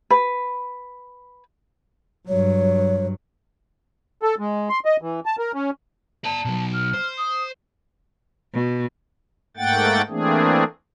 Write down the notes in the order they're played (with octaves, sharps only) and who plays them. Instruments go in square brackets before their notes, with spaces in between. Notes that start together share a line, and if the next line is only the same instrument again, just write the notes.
[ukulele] B4
[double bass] G2 F#3 [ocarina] C#5
[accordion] A4
G#3
C6
D#5
E3
A5
A#4
C#4
[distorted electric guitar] D5 A#5 [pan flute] A5
[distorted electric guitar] B2 F#3
[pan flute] F6
[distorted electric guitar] C5
[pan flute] D#6
[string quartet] B2
[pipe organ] G#2 A3 A#3 F#5 G5 A6
E3 A3 A#3 C4 D4 G#4